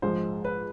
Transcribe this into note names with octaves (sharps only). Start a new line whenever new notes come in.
A#1 G#2 F3 G#3 C5
B4